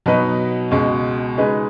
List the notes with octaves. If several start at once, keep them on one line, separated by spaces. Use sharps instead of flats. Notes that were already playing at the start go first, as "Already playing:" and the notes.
B2 F#3 D#4 B4
C#2 B2 G#3
C#3 G#3 D#4 G#4 B4